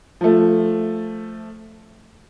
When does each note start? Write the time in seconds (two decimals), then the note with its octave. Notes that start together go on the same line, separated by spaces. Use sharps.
0.21 F3 A3